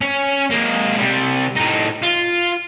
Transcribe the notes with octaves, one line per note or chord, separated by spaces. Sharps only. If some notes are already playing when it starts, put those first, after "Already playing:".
C#4
G#3 A#3
C3 G3
A2 D#4
F4